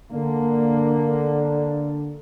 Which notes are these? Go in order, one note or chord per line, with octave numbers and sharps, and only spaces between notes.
D3 A#3